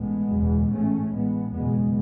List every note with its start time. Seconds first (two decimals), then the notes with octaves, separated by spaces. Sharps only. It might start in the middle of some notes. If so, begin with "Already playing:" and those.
Already playing: A1 A2 G#3 B3
0.30 F#1 E2 B2
0.70 A1 G#2 A3 C#4
1.11 A1 A2 G#3 B3
1.52 F#1 E2 B2 G#3 B3